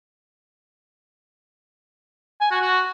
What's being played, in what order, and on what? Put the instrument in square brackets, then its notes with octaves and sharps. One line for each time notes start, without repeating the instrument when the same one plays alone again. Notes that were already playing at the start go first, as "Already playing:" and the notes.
[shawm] G#5
F#4
F#4